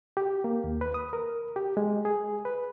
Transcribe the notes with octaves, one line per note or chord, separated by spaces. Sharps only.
G4
A#3
D#2
B4
D#6
A#4
G4
G#3
G#4
B4